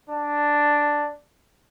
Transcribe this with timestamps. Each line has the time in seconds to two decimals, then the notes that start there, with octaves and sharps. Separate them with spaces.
0.10 D4